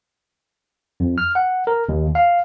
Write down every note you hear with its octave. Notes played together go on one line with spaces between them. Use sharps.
F2
F6
F#5
A#4
D#2
F5